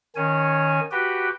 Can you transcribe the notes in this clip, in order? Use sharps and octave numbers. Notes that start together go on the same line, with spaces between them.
D#3 C#4 C#5 G#5
F#4 G4 B4 G5